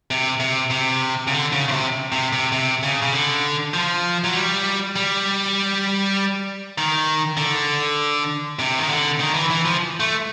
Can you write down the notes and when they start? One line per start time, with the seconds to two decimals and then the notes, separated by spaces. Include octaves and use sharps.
0.11 C3
0.40 C3
0.71 C3
1.28 C#3
1.31 D3
1.52 C#3
1.68 C#3
1.71 C3
2.12 C3
2.33 C3
2.52 C3
2.83 C#3
3.02 C#3
3.13 D3
3.74 F3
4.24 F#3
4.35 G3
4.96 G3
6.78 D#3
7.37 D3
8.59 C3
8.79 D#3
8.89 D3
9.20 D#3
9.35 E3
9.50 E3
9.65 F3
10.00 A3